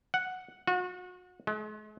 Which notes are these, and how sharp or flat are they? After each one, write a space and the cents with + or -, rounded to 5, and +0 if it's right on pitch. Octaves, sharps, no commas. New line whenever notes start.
F#5 -5
F#4 -35
G#3 +45